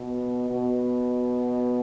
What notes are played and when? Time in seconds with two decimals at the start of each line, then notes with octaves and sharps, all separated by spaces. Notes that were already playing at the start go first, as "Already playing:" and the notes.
Already playing: B2
0.50 B2